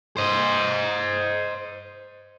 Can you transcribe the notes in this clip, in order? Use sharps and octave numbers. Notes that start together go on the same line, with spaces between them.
C5 D#5